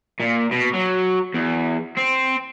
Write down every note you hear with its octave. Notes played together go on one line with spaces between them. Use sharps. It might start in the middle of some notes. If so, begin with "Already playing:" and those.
A#2
B2
F#3
E2
C4